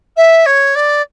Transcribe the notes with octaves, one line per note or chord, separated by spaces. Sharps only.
E5
C#5
D5